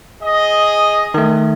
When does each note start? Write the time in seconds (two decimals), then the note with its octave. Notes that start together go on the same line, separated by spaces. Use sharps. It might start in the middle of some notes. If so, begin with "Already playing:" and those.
0.22 G#4 D#5
1.14 D#3 A3